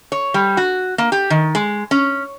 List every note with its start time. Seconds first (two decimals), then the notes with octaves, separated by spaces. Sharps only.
0.12 C#5
0.34 G3
0.57 F#4
0.98 A#3
1.12 G4
1.30 D#3
1.55 G#3
1.91 C#4